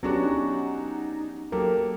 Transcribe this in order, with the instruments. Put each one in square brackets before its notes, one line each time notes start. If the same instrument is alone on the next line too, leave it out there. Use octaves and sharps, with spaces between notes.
[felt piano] F#3 D4 F#4 [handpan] B3 C#4 G4 [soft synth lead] A#5
[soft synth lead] D#4
[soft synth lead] F#3 [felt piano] A#3 G4 A4 [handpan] A#4